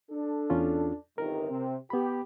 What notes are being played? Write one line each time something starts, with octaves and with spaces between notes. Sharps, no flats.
D4 A4
E2 C#4 F4
G1 C3 D#3 A#4
C3 C4
B3 G4 B5